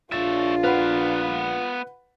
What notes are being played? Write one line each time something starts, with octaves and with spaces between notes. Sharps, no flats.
A#1 D4 F4 C#5 E5 A6
B3 B4 F5 F#5 B5